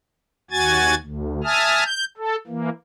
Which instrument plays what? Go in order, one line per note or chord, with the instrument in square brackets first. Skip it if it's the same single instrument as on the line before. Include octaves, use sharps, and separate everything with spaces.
[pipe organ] D#2 F#4 G#5 G#6 A6
D2
E5 G#5 A5 D#6 F6
G6
A4
E3 A#3